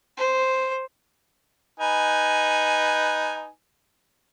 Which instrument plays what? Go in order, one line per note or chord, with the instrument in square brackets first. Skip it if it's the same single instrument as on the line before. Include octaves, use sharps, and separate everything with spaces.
[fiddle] C5
[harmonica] D#4 B4 G#5